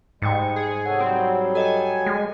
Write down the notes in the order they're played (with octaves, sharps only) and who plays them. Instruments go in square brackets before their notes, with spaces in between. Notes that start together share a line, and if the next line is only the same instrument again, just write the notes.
[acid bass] G#2 [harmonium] G3 G#3 [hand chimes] G5 D#6 C#7
[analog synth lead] G#4
[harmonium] C3 A4 C#5 [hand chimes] F#5
[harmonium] F#3 G3 [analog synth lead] C4
[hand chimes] A4 D#5 G5 [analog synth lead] G#5
[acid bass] G#3